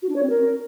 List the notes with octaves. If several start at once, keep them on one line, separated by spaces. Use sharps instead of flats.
F#4
D4
C#5
C4
A#4